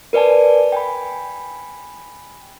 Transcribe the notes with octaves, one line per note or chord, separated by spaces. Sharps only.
A#4 B4 D5 G#5 A5
G5 G#5 B5